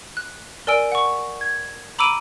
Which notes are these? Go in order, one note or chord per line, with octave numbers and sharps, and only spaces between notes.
F#6
A#4 D5 G#5 E6 D7
F#5 C#6
G#6
A#5 B5 D6 E6 D7 D#7